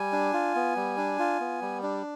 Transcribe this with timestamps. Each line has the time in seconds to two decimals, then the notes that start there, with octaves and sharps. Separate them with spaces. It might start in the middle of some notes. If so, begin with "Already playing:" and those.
Already playing: G3 G#5
0.13 D4
0.33 F4
0.55 B3
0.76 G3
0.97 D4
1.19 F4
1.40 B3
1.62 G3
1.83 D4